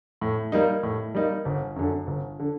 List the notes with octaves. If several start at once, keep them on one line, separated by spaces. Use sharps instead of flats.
A2
G3 A#3 D#4
A2
G3 A#3 D#4
G1
F#2 D3
G1
D3